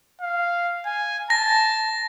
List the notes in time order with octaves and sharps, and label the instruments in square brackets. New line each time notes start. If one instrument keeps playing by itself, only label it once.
[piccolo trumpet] F5
G#5
[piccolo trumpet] A5 [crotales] A#6